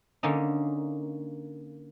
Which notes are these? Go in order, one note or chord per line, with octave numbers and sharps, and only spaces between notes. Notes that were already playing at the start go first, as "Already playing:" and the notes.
D3 A#3 C#4 D#4